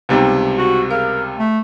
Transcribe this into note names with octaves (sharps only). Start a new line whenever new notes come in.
C#2 C3 G3 B3 D#4
F#4
G#4 A#4 F5
A3